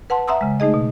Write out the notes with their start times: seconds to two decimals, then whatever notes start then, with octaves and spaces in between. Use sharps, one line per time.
0.10 B4 F#5 A5 C6
0.28 E5 F#5 A#5 C6 D#6 E6
0.41 C#3 G#3
0.60 A3 D#4 G#4 D#5
0.74 B2